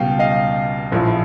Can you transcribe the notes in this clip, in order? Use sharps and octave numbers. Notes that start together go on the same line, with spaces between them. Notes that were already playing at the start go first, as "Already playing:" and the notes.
Already playing: C#2 B2 G3 F5 G5
D#5 F5
A#1 A2 F3